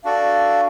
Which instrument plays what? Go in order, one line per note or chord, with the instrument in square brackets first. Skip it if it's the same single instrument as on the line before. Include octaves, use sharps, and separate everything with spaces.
[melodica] D4 F#4 A4 D5 [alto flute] F5